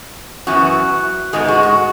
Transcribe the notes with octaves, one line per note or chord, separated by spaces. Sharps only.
F#2 E3 B3 F#4
G#2 G#3 B3 G#4
F#4
F#4